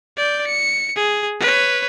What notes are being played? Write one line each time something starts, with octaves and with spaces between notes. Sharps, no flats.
D5 G6
C#7
G#4
B4 C#5